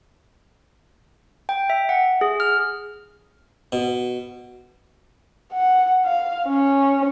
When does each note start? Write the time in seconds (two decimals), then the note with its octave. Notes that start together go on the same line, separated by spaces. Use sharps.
1.49 G5
1.70 E5
1.89 F#5
2.21 G#4
2.40 F6
3.72 B2
5.52 F#5
6.05 F5
6.47 C#4